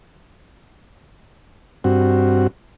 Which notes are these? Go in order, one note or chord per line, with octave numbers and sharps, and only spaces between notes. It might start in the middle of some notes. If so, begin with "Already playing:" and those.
G2 C4 F#4